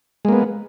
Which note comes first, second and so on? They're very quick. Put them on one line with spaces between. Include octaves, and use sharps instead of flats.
G#3 A#3 B3